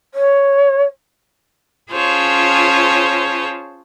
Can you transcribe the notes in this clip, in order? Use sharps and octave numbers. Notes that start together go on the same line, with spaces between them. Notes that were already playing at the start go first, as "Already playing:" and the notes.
C#5
C#4 F4 G#4 C5 C#5 A5